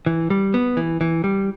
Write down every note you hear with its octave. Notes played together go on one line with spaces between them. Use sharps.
E3
G3
B3
E3
E3
G3